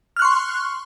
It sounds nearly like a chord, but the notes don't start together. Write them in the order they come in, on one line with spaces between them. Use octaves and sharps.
F6 F#6 C#6 C6